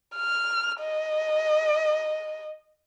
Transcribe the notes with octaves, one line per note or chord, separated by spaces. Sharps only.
F6
D#5